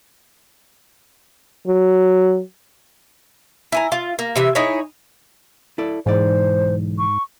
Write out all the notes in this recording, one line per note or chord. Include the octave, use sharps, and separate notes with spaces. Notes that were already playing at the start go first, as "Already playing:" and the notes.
F#3
E4 G#5 A#5
F4
A#3
C3 E3 E5
D#4 E4 G#4 C#5
E4 A4 D5
B1 G#2 E3 C5 D5
C#6